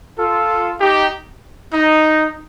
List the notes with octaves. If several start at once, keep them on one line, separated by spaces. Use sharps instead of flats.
F4 A4
D#4 G4
D#4